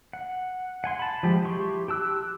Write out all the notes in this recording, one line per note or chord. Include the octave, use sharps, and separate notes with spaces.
F#5
F#5 G#5 C6
A5 B5
F3 G#3 G4
E4 G4 C6 C#6
G4 A5 E6 F#6